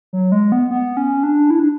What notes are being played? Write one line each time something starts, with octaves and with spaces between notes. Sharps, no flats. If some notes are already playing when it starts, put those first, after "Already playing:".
F#3
G#3
B3
B3
C#4
D4
E4
D4